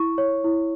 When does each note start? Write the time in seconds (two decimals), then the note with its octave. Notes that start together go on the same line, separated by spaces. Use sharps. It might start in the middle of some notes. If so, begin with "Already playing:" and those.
Already playing: E4 C#6
0.18 C#5
0.44 E4